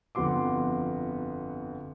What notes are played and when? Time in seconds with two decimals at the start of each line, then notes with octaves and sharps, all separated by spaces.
0.15 G1 F2 B3 F#4 C6 D6